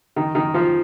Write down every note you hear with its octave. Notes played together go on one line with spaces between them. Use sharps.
D#3
D#3
F3